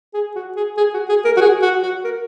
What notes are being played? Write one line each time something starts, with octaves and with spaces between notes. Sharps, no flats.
G#4
F#4
G#4
G#4
F#4
G#4
A#4
F#4
G#4
F#4
F#4
A#4